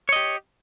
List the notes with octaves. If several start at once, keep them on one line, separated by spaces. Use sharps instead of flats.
G4 C#5 D#5